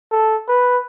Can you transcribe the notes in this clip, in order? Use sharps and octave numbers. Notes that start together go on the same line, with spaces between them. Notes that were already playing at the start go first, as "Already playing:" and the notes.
A4
B4